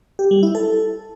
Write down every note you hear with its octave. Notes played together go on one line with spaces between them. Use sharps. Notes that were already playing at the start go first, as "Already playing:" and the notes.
G4
G3
E4
A4